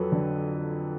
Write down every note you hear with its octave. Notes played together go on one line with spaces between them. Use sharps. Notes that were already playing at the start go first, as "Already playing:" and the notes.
Already playing: F2 F#3 A4 B4
D3